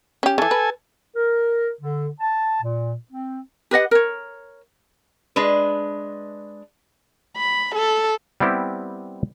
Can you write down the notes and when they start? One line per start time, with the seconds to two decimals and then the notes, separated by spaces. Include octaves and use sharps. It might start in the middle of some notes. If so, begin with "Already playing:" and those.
0.23 C#4 G4
0.38 C#3 E3 A4 G#5
0.51 B4
1.16 A#4
1.81 D3
2.20 A5
2.62 A#2
3.11 C4
3.71 G4 B4 D#5 F#5
3.91 A#4 C#5
5.36 G#3 D4 B4
7.37 B5
7.75 A4
8.40 G3 B3 C4 E4 G4